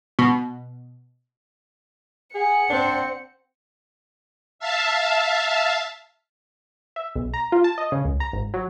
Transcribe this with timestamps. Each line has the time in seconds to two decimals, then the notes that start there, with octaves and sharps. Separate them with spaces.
0.19 B2
2.35 G#4 F#5 C#7
2.70 C4 D4
4.59 E5 F5 A5
6.96 E5
7.16 B1
7.34 A#5
7.52 F4
7.64 A5
7.78 D#5
7.92 C#3
8.05 C#2
8.20 A#5
8.33 G#1
8.54 F#3